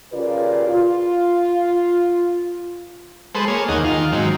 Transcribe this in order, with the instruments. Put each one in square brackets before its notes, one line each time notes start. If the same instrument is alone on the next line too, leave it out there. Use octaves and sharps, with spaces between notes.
[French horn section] C#3 F4 G4 A#4 B4 D5
F4
[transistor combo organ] G#3 A4 B4 C5
A#3 G#4 C#5
D#2 A#3 D#4 G#4 F#5
D#3 F4
G#2 D#3 F#3 C4